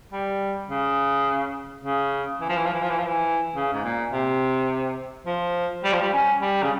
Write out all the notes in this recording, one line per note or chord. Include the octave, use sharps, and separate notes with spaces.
G3
C#3
C#3
E3
F3
E3
F3
E3
F3
E3
F3
E3
C#3
G#2
A#2
C3
F3
G3
F3
G3
C#4
G3
C#3